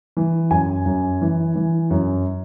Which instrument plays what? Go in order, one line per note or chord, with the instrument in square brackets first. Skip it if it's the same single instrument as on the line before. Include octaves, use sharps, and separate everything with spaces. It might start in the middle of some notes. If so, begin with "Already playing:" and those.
[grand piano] E3
F#2 G#5
F#2
E3
E3
F#2